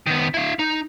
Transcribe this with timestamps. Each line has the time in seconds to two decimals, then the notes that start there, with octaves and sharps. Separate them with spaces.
0.06 D#3 B3
0.34 E4 F5
0.59 D#4